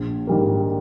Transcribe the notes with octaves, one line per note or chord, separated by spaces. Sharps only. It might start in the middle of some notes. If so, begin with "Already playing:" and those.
Already playing: A#1
G#2 D#3 G3 A#3